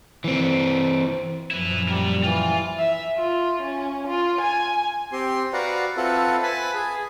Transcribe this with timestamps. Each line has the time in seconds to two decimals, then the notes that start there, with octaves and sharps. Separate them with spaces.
0.24 E3 C4
1.51 F#2 A#2 F3 E4 B4
1.88 G3 A#4 D5
2.23 E3 F4
2.79 E5
3.18 F4
3.62 C#4
4.07 F4
4.41 G#5
5.12 C4 G4 C6
5.53 F#4 B4 D5 F5 F#5 A#5
5.97 C4 F4 A4 B4 E5 F#5
6.43 B4 G#5 A5 B5
6.74 G#4